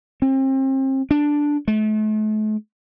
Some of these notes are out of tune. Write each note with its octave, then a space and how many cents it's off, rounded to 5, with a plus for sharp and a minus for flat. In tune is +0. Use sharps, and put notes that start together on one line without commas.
C4 +35
D4 +0
A3 -40